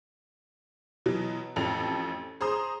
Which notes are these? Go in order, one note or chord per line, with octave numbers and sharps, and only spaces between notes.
B2 E3 F#3
A1 F2 A4 F7
G#4 C5 A#5 C6 D#6